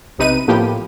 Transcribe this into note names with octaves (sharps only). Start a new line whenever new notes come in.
B1 C3 D#4 B4 D#7
A2 F3 A#3 B3 G4